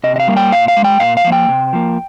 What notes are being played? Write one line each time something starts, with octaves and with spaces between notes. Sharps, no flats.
C3 D#5
D#5
F5
G3 A#3
G5
A#2 F5
F5
G#3
G5
A#2 F5
F5
F3 A#3
G5
C3
F3 A#3